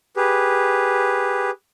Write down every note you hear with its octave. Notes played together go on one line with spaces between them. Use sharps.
G4 G#4 B4